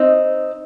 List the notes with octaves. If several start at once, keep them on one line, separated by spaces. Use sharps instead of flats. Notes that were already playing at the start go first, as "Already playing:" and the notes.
Already playing: C4 D#4